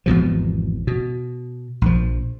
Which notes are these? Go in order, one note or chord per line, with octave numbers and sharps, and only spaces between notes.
G#1 E2 B2 F3
B2
A#1 F3